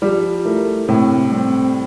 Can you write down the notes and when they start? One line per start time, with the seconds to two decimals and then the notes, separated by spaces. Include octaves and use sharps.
0.02 F3 G3
0.45 A3 E4 A#4
0.88 A2 C3
1.31 G3 C4